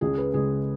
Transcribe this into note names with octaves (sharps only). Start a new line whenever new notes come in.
C#2 C#3 G#3 G#4
B4
C#2 C#3 G#3 G#4